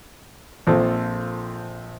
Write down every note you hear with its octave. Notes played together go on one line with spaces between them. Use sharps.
A#1 C4 F4 A4